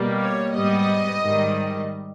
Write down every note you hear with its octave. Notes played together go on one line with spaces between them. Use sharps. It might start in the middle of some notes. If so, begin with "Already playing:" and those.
Already playing: B2 G3 A#3
C#5
G#2 G3 B3 D#5
G#2 D#3 G3